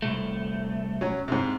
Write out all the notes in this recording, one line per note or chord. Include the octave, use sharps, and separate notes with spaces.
C2 A3
F#3 C#4
G#2 C3